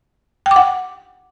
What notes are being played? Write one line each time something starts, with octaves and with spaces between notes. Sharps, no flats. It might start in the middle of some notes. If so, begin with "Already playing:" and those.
G5
D6
F#5